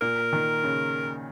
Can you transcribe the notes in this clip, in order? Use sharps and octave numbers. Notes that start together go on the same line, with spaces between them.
A#2 A#4
D#3
C#3